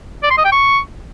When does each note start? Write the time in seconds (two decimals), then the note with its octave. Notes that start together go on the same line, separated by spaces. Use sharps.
0.23 D5
0.31 C6
0.38 D#5
0.45 G5
0.52 C#6